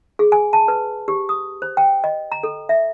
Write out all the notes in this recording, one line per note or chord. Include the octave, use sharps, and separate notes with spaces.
G#4
G#5
A5
B4
G4
D#6
C5
G5
D#5
A#5
A4
E5